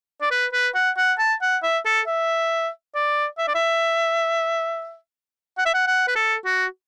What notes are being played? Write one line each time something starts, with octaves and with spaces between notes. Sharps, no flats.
D5
B4
B4
F#5
F#5
A5
F#5
E5
A4
E5
D5
E5
D5
E5
F#5
E5
F#5
F#5
B4
A4
F#4